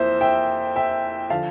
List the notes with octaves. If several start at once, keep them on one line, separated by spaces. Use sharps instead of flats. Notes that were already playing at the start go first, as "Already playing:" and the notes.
Already playing: F2 E3 A#3 C5 E5
E5 G5
E5 G5
D3 F3 F5 A5